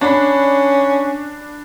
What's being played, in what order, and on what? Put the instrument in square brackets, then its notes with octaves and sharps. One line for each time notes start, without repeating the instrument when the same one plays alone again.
[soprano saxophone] C#4 [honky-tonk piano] D4 B5